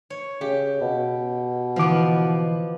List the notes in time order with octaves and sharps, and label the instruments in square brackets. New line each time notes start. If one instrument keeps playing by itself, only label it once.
[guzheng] C#5
[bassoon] C#3 [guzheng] G4
[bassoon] B2
[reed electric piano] D3 E3 D6 [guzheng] F3 B3